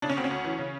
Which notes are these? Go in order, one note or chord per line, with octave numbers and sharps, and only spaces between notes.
C#3 D4
C#4
D2 C4
C#4
D2
E3
C#3